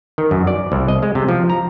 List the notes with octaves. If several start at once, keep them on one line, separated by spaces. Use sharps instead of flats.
D#3
F#2
D5
C2
D#5
G#3
C3
F3
A#5